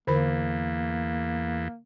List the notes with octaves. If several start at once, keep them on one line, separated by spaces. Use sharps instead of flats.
E2 D3 A#3 A#4 B5